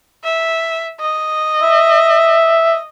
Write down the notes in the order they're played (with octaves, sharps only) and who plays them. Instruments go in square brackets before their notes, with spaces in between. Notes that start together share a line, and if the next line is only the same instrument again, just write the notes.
[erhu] E5
D#5
[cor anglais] E5